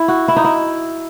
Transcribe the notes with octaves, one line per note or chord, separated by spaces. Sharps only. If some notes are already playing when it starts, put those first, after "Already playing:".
Already playing: E4
F#4
E4
D#4
E4